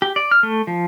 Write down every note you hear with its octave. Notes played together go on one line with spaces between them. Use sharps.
G4
D5
F6
A3
F3